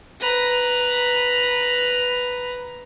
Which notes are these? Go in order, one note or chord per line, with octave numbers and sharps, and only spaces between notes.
B4 A#5